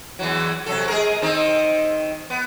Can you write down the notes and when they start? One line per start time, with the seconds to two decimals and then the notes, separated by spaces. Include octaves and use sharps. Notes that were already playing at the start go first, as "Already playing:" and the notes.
0.19 E2 E3 F#3
0.66 C3 F#3 A4
0.88 G#3 G#4 A#4
1.22 D#3 C4 D#4
2.30 B3